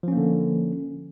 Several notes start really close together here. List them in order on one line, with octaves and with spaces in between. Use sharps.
F3 C#4 A#3 D3